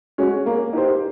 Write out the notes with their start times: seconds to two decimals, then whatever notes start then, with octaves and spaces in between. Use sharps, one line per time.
0.18 G#3 C#4 F#4
0.46 A#3
0.73 D#4 G4 C5